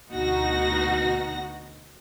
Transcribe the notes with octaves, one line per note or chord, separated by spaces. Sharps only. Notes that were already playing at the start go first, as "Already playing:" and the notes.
D2 B2 D#4 F#4 F#5 A#6